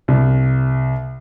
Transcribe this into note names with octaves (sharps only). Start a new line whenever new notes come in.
C2